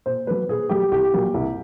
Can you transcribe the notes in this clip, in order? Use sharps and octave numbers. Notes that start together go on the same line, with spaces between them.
A#2 C5
F#3 A3 B4
A#2 G#4
F#3 A3 G4
C2 G4
A#2 F#3 A#3
C2